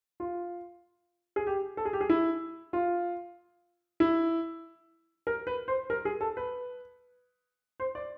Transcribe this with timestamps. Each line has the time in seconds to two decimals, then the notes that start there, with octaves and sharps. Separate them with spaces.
0.20 F4
1.36 G#4
1.47 G4
1.77 A4
1.85 G#4
1.93 G4
2.01 G#4
2.10 E4
2.73 F4
4.00 E4
5.27 A#4
5.47 B4
5.68 C5
5.90 A#4
6.05 G#4
6.21 A4
6.37 B4
7.80 C5
7.95 D5